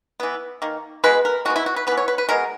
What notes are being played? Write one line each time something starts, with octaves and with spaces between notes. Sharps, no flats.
E3 B3
D#3 A#3
B2 G#3 B3 B4
A#4
D#3 G#3 B3 F#4
E4
F#4
B4
E3 B3 B4
C#5
B4
B4
B2 G#3 B3 A#4